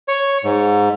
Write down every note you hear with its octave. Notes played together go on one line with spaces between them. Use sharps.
C#5
G#2